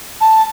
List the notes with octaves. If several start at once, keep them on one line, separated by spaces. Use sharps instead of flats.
A5